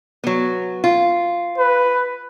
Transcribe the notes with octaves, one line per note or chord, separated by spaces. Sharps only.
F#3 B3
F4
B4